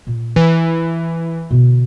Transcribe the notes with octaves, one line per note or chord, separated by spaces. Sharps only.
A#2
E3 E4
B2 D3